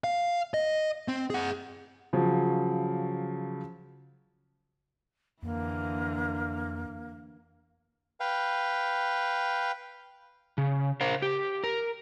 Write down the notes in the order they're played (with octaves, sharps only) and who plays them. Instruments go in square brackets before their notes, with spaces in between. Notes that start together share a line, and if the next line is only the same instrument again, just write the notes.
[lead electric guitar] F5
D#5
C4
G#4 F#5
[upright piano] C#3 F3 F#3
[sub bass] F2 [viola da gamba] D3 E3 [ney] A#3
[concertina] B4 F5 G5
[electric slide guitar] C#3
A#4 C5 F5
G4
A#4